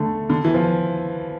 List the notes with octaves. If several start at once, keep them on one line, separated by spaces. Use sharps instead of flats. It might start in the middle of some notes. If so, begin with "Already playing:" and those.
Already playing: D3 A3
D3
E3
F3